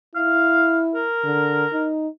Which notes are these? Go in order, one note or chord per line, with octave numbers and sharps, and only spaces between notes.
E4 F5
A#4
D3
D#4